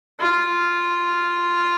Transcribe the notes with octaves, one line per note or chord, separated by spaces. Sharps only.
F4